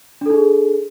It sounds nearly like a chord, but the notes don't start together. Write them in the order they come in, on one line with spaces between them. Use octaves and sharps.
D4 A4 D#4 G#4